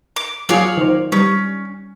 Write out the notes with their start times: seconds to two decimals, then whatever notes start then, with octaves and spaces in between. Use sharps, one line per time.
0.16 D6
0.49 F#3 F4 G#4 C#5 D5 F5
0.77 D#3 C5
1.12 G3 C#4